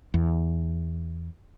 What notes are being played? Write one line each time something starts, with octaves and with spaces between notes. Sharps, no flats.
E2